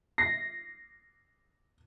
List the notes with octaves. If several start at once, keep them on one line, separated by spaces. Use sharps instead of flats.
A#6 C7